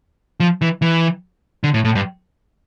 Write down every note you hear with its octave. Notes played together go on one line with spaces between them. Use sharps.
F3
E3
E3
D3
A2
A2
G2